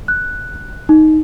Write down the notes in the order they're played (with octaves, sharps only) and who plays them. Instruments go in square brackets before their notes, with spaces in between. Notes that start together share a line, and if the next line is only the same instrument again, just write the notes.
[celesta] F#6
D#4